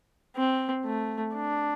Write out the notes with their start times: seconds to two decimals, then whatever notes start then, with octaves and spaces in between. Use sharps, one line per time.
0.36 C4
0.85 A3
1.34 D4